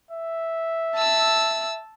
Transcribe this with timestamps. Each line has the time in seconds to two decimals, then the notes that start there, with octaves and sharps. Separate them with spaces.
0.11 E5
0.96 A5 E6